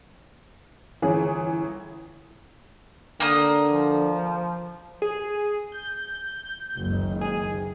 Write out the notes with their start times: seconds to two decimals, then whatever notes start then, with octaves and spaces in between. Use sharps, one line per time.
1.02 G1 E3 C#4 G#4
3.20 D3 A#3 D#6
3.70 F3
5.02 G#4
5.72 G6
6.78 F#1 C#2 D#3
7.21 G#4